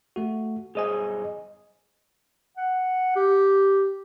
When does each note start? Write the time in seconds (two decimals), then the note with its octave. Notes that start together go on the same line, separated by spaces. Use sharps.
0.16 A3 F#4
0.75 B1 G2 G#4 C5 D#5 G#5
2.57 F#5
3.16 G4